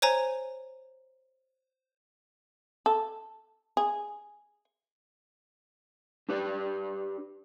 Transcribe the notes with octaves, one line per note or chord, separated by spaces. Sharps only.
C5 C#5 G#5 A#5
A4
G#4
D4 G4 B4 D5